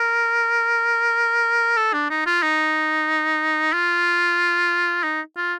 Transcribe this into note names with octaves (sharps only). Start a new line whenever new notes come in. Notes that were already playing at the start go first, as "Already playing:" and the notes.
Already playing: A#4
A4
D4
D#4
F4
D#4
F4
D#4
F4